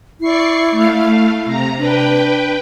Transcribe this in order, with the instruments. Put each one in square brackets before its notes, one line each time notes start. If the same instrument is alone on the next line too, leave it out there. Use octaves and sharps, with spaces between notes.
[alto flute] E4 [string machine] D5 C#6 C7
[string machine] A3 F5
C3 A#5
[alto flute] D4 [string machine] B4 G5